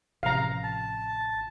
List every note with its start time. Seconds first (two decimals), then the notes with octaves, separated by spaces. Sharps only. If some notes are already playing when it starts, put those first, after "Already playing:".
0.23 A1 C3 F3 F5 A#5
0.63 A5